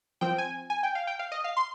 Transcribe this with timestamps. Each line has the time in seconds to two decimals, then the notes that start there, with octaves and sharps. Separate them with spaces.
0.21 F3 C4 G5
0.38 G#5
0.70 G#5
0.83 G5
0.95 F5
1.07 G5
1.19 F5
1.32 D#5
1.44 F5
1.57 C6